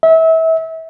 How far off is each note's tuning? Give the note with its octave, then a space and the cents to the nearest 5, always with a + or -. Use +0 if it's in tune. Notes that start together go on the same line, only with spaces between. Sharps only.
E5 -30